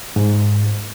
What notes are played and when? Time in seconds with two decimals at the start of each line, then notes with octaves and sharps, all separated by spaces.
0.16 G#2